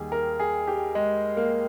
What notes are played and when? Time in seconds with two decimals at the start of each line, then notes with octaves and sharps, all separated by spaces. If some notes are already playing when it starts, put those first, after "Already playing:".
Already playing: D#2 D#3 G3 G#4
0.12 A#4
0.40 G#4
0.68 G4
0.95 G#3
1.37 A#3